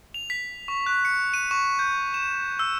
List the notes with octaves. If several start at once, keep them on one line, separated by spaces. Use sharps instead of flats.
F7
B6
C#6
F#6
C#7
D#7
C#6
G6
E7
E6